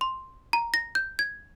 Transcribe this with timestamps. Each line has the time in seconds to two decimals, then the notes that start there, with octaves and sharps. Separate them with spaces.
0.01 C6
0.53 A#5
0.74 A#6
0.95 G6
1.19 G#6